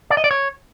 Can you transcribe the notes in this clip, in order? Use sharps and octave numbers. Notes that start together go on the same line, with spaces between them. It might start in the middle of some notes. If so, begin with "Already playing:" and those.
D5
D#5
D5
C#5